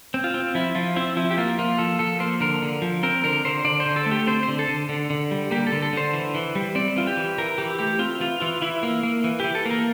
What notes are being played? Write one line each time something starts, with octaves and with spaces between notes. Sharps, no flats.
C4
F4
C4
F3 E4
F3 F4
C4 E4
F3 E4
G4
A#3 F4
A#3 F4
F3 A4
F3 A4
A#3 C5
D3 A#4
D3
F3
C4 A#4
D3 A#4
D3 C5
D3 D5
C5
D3
A4
A3
G4
C4 C5
C5
D3
A4
D3
D3
D3
G3
A#3 G4
A4
D3
A4
D3 C5
E3
E3
G3
C4 D5
E3 F4
G4
E3
E3 A#4
E3 G4
A3 G4
C4 F4
E3 F4
E3 F4
E3 E4
A#3
A#3
E3
E3 G4
A4
A#3
A#4